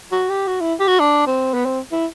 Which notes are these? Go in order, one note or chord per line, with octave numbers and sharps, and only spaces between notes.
F#4
G4
F#4
E4
G4
F#4
D4
C4
B3
C4
E4